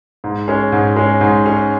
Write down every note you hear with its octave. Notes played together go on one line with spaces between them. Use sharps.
G#2
G#3 C#4
G#2
G#3 C#4
G#2
G#3 C#4